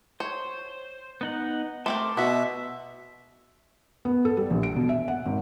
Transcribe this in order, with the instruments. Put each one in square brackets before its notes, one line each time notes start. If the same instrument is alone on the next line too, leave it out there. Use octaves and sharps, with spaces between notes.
[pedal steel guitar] C5 [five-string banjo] C#5
[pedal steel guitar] B3 D#4 F#5
[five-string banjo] A3 C4 A#4 [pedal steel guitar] A5 C6 D6
[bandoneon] B2 E5 [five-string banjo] B3 F#4
[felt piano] B3
A4
G3
A#1
D7
B2
E5
F#5
G#1